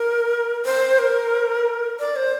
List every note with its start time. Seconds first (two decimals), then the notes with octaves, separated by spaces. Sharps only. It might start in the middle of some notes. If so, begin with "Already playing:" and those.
Already playing: A#4
0.65 C5
0.99 A#4
1.99 D5
2.16 C5